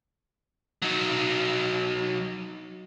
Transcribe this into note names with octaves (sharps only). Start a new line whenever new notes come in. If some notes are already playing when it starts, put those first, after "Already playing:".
F#3 D#4